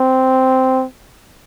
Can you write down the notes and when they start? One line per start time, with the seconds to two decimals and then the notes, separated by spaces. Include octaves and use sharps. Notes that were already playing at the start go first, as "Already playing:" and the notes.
Already playing: C4